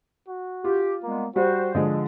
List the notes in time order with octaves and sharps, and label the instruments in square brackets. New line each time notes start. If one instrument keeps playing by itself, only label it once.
[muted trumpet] F#4
[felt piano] F4 [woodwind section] G4
[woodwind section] G3 G#3 B3 [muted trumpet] A#3
[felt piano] G3 [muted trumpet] F#4 [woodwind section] C5
[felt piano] D3 F3 G#3 [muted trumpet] D#5